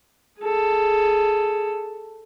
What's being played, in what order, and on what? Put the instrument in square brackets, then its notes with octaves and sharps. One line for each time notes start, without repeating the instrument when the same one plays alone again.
[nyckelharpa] G#4 A4